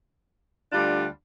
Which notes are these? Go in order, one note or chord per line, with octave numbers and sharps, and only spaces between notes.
D2 D3 G3 D4 F4